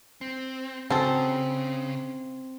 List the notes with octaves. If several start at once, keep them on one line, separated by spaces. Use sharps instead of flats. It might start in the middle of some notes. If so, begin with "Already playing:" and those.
C4
C#3 G#3 C4 F#4 A4